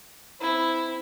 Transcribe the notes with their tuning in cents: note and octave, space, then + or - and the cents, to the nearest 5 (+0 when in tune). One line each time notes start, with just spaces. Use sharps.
C4 -20 E4 +0